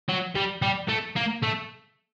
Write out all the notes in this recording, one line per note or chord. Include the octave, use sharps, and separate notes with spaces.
F#3
G3
G3
A3
A#3
A3